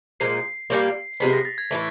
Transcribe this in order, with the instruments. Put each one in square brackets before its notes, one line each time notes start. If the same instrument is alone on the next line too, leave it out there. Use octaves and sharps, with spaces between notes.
[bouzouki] A#2 F3 G#3 [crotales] C7
[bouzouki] A#2 G3 A#3
[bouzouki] C3 F3 G#3 B3 [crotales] B6
[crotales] A#6
A6
G#6
[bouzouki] A2 E3 A3